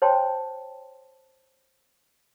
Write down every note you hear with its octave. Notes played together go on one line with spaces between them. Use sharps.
C5 C#5 G5 A5 C6